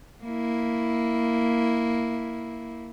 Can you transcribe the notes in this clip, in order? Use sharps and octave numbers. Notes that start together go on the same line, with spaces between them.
A#3 E4